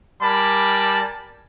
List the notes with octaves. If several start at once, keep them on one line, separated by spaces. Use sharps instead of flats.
G3 A#4 D5 G#5 A5 B5